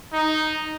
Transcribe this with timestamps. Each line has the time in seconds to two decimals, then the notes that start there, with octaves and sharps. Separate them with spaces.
0.14 D#4